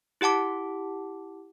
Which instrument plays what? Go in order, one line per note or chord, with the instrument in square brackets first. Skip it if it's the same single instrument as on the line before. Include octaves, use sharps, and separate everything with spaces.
[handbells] E4 G4 F#5 A5 D6